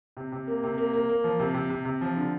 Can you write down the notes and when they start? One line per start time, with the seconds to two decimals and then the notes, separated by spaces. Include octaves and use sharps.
0.17 C3
0.32 C3
0.47 A#3
0.63 C3
0.78 A#3
0.93 A#3
1.09 A#3
1.24 F3
1.40 C3
1.54 C3
1.70 C3
1.85 C3
2.01 F3
2.17 D3